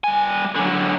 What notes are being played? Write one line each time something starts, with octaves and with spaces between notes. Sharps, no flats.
G3 G#5
D3 F#3